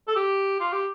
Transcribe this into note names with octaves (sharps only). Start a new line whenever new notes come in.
A4
G4
F4
G4